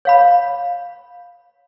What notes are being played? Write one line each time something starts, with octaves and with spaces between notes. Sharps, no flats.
C#5 F5 B5